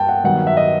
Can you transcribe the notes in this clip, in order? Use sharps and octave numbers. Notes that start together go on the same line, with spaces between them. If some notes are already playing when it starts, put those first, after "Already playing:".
Already playing: G2 G5 A5
F#5
G2 D#3 F#3 B3 F#5
E5
D#5